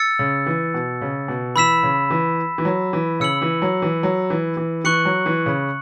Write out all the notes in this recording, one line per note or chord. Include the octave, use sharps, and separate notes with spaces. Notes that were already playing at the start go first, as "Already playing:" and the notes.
Already playing: E6 A6 C#7
C#3
E3
B2
C#3
B2
E3 B5 E6 B6 E7
C#3
E3
E3
F#3
E3
C#3 E6 C#7 F#7
E3
F#3
E3
F#3
E3
E3
E3 C#6 F#6 C#7 F#7
F#3
E3
C#3